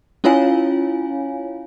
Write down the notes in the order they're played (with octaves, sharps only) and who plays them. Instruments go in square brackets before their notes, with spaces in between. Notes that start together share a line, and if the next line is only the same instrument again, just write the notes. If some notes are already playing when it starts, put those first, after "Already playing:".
[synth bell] C#4 E4 F4 C#5 F5 G#5